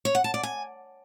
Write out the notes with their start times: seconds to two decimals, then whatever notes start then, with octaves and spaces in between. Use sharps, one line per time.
0.05 C#5
0.15 F#5
0.24 A5
0.34 D5
0.43 G#5